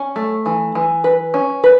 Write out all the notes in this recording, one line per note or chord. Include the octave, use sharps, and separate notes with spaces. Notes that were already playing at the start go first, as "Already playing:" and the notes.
Already playing: C#4
A3
E3
E3
B4
C#4
B4